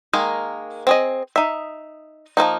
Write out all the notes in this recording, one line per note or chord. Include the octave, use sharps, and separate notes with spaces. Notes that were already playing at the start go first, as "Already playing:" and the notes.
D#3 G#3 A#3
C4 G#4 D#5
D#4 E5
F3 A3 A#3 D#4